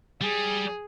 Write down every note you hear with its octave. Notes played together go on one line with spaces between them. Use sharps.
G3 G#4